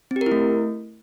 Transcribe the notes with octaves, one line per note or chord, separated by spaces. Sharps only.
C4
G4
A#4
E4
A3